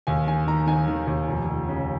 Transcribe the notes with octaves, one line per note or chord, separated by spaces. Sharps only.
D#2 G#5
D#3 G#5
D#3 A#5
D#3 G#5
D#3
D#2
F1
F1
C#3